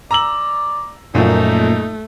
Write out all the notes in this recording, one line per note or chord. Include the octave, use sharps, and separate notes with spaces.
D5 A#5 E6 F#7
F#2 A#2 F3 A3 D#4